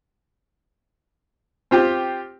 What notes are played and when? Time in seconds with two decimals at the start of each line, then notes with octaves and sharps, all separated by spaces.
1.71 C4 F4 G4